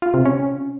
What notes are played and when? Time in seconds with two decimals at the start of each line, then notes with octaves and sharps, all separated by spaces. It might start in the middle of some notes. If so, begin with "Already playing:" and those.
0.02 F4
0.14 C3
0.25 C#4